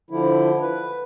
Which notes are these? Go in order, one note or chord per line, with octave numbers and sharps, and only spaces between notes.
D3 F3 E4
B4